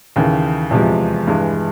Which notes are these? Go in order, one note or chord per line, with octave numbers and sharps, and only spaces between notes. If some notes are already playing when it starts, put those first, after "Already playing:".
D#2 C#3 E3
E2 C3 F3 G#3
G2 E3 G#3